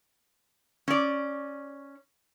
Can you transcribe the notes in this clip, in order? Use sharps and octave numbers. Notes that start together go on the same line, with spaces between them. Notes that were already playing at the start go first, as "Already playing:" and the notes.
C#4 D5